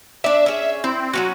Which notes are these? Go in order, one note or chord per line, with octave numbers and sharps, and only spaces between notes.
D4 D5 E5
C#4 G#4
C4 E4
F#3 B3 C#4 F#4